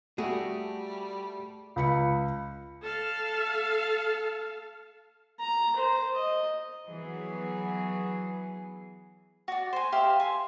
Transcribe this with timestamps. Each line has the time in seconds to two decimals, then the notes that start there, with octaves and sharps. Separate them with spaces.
0.18 G3 A3 F#4 G#4
1.76 C#2 B5 C#7
2.83 A4 F5
5.40 A#5
5.76 C5
6.15 D#5
6.87 E3 F#3 B3 G#4
9.48 F#4 D5
9.73 C5 G#5
9.92 G4 E5 F5 C6
10.20 G#5 C6